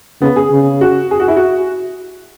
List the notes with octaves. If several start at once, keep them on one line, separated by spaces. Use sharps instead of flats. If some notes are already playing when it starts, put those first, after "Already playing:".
C#3 B3
G#4
C#3
F#4
G#4
F#4
E4
F#4